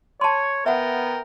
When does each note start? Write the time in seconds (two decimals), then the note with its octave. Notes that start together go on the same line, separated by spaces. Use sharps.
0.21 C#5 A5 C6
0.66 B3 A#4 E5 F#5 G5